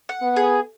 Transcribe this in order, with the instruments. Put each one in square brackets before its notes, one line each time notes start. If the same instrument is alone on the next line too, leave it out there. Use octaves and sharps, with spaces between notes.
[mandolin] F#5
[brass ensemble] B3
[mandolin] G#4